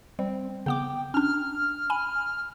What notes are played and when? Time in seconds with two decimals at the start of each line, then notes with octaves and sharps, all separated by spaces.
0.19 G3 C4
0.66 C#3 B3 G5 D6
1.14 C#4 D4 F6
1.90 G#5 B5